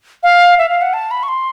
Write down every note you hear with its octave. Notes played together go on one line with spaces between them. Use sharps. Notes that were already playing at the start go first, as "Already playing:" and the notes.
F5
E5
F5
F#5
A5
B5
C#6
C6